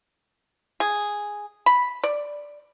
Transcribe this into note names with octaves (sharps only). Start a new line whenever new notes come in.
G#4
B5
D5